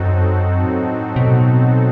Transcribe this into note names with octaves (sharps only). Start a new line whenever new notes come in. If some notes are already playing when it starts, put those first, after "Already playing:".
Already playing: F#2 F#3 C4 D#4 F#4 A4
A2
B2